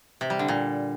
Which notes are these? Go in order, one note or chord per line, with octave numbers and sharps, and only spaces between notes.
C3
G3
D3
A#2